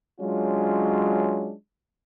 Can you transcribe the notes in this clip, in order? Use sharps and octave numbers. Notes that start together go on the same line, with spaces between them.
F#3 G#3 C#4 D4 F4